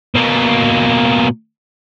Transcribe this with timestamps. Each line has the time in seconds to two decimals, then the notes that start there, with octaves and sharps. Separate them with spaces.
0.15 B2 A#3